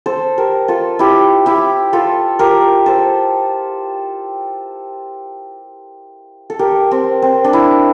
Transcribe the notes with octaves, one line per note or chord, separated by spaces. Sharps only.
A4 C5
G4 A#4
F4 A4
E4 G4
E4 G4
F4 A4
G4 A#4
A4 C5
A4
G4 A#4
C4
C4
D4
E4